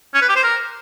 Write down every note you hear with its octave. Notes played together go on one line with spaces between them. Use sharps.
C#4
B4
G4
C5
A#4